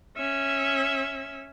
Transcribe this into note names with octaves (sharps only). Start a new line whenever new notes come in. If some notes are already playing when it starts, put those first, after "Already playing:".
C#4 E5